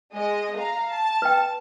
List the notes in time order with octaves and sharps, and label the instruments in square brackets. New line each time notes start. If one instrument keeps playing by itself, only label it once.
[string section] G#3 D#5
F5 A#5
A5
[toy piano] B4 G5